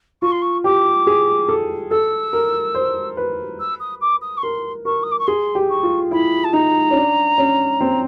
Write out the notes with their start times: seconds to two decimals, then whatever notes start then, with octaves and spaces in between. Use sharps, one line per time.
0.22 F4 C#6
0.32 C6
0.42 C#6
0.64 G4 D6
1.07 G#4
1.49 A4
1.91 A4 E6
2.33 A#4
2.75 C5
3.17 B4
3.60 E6
3.80 D#6
4.01 D6
4.22 D#6
4.37 C#6
4.43 A#4 C6
4.85 A#4 C#6
5.03 D#6
5.11 D6
5.19 C#6
5.27 G#4 C6
5.55 G4
5.70 C#6
5.83 F4
6.11 E4 B5
6.44 A5
6.53 D#4 A#5
6.91 C#4
6.96 D4
7.38 C#4
7.81 C4